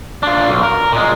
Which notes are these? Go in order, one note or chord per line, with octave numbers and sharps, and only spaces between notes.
D4 F4
B1
A#4
A#2 G#3